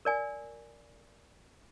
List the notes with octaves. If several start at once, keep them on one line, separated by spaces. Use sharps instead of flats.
A#4 D5 G#5